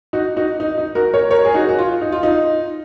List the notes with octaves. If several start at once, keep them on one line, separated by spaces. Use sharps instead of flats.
D#4 F#4
D#4 F#4
D#4
D#4
F#4 A#4
A#4 C#5
A#4 C#5
G#4
D#4 F#4
F#4
F4
D#4
F4
D#4